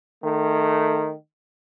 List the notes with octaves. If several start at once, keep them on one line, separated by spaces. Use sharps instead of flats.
D#3 A3